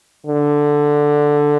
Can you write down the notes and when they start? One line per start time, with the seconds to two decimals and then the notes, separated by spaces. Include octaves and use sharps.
0.27 D3